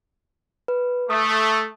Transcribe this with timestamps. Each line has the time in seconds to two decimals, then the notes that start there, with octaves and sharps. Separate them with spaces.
0.68 B4
1.10 A3 D#6